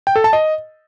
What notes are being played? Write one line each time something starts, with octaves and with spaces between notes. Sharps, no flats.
G5
A4
A5
D#5